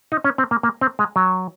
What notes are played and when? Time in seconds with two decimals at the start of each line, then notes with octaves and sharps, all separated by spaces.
0.12 D#4
0.24 C#4
0.38 C4
0.51 A#3
0.63 A#3
0.81 C4
0.99 G#3
1.16 F#3